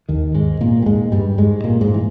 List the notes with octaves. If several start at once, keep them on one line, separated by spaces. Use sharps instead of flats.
D#2 D#3
G#2 G#3
A#2 A#3
G3
G#2 G#3
G2 G3
G#2 G#3
A#2 A#3
G#2 G#3
E3